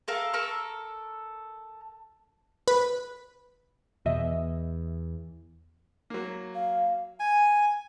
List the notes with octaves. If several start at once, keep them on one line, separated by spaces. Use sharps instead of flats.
A4 A#4 F5
A4 A#4 C#6 E6
B4
E2 B2 D#5 E5
F#3 A#3
F5
G#5